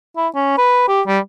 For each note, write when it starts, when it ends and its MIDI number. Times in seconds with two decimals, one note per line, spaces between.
0.17 0.28 64
0.35 0.54 61
0.58 0.83 71
0.88 1.01 67
1.07 1.19 55